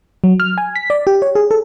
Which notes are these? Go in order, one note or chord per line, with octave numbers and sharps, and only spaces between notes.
F#3
F6
G#5
B6
D5
G4
C#5
G#4
A4